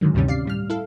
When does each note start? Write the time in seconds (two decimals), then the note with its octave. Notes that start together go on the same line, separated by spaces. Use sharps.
0.01 G#2 D3 D#3 F#3
0.14 D2 G2 C3 D#3 G3 C#4
0.28 D5 F5 C7
0.45 A2 G3 F6
0.70 E4 A4 F5